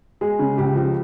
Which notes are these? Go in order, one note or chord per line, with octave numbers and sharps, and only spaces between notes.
G#3 G#4
C#3
C#2 G4
F3